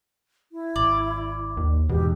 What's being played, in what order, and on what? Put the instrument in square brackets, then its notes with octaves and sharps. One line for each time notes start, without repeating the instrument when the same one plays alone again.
[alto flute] E4
[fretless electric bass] G#1 [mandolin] D5
[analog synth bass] D#2
[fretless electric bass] E2 G#2 [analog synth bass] B2 [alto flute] G4